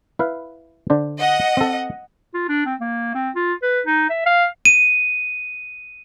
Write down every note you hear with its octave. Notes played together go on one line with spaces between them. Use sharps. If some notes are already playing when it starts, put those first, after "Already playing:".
E4 B4 F5
D3 D4 C5
D#5 F#5
C4 A4
F4
D4
C4
A#3
C4
F4
B4
D#4
E5
F5
D#7